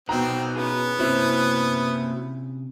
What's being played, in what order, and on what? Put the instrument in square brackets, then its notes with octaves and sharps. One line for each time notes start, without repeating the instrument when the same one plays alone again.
[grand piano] B2 A#5 [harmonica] C4 [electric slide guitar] D#4 F#4 B4
[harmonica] B3 [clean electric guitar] C#4 E4 G#4
[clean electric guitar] C3 C#4 [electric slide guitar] A#3 F#4 [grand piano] C4 E4